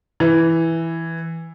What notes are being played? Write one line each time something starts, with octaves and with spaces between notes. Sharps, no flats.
E3